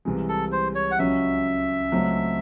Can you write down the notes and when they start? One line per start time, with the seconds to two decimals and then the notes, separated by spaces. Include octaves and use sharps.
0.05 C2 C3 E3 G#3
0.29 A4
0.52 C5
0.75 C#5
0.91 F#5
0.99 C#2 C#3 F#3 C#4 F#4 E5
1.92 C#2 C#3 F#3 A3 C4